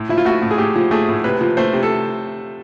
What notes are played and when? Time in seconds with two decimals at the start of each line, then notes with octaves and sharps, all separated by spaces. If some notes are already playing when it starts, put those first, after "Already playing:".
Already playing: A2
0.09 F3 E4
0.18 F4
0.25 A3 F#4
0.42 A2
0.51 G#4
0.58 A2 G4
0.76 F3
0.91 A3 G#4
1.08 A2
1.24 C3 B4
1.41 F3
1.57 A3 C5
1.73 C3
1.83 A4